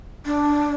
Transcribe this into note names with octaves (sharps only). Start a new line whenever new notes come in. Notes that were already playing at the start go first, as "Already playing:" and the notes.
D4